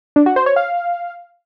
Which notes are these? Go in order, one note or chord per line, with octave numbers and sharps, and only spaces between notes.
D4
F#4
C5
C#5
F5